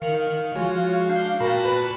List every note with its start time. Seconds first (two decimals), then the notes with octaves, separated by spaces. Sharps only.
0.02 D#3 A#4 F5 C#7 F7 F#7
0.56 F3 G#3 F4 F#4 C#5
1.09 D4 G6 C7
1.40 A#2 F#4 A#4 G5 A5 B5
1.65 B4